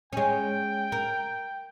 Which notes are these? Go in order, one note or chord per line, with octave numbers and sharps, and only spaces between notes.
G#3 C#4 G5
A#4